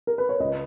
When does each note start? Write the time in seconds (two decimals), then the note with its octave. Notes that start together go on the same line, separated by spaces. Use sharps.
0.07 A#4
0.18 B4
0.29 C#5
0.40 C#2 D#5